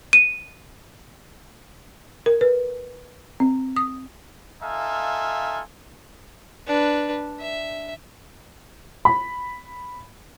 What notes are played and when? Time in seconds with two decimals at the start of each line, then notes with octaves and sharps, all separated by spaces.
0.13 D#7
2.26 A#4
2.41 B4
3.40 C4
3.76 D#6
4.62 D#4 F4 A4 E5 F5 G#5
6.67 D4 B4
7.40 E5
9.05 B5